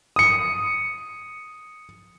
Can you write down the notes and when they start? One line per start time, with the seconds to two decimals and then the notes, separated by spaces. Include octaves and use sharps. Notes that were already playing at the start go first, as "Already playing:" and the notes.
0.16 D#6 C#7